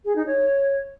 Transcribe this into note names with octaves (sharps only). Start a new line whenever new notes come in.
G#4
D#4
C#5